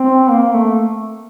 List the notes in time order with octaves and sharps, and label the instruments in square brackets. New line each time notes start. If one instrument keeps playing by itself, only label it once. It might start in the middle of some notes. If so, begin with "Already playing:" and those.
Already playing: [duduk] C4
A#3
A3